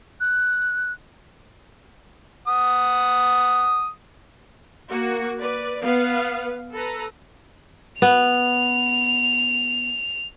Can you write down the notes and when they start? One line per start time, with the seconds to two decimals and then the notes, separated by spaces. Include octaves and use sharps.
0.20 F#6
2.48 F#5 D#6
4.89 A#3 F#4
5.40 B4 D5
5.84 B3 B4 F5
6.73 A4 B4 A#5
8.02 B3 F7